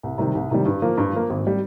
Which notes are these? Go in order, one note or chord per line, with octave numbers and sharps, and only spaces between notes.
C2
C3 D#3 G3
C2
C3 D#3 G3
G2
F3 A#3
G2
F3 A#3
G#1
G3